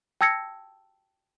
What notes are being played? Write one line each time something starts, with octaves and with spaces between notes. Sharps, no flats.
G5 A5 E6 G#6 A#6 C#7